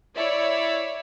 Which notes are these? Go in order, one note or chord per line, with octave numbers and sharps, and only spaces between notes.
E4 C#5 D5 E5